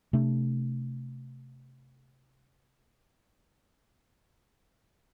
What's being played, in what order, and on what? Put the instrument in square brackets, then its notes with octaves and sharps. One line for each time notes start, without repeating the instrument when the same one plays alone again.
[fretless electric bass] C3 A3 D4